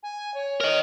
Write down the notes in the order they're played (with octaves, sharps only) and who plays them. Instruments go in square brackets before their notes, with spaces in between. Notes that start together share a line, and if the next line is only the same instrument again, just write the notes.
[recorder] G#5
C#5
[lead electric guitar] A#4 D#5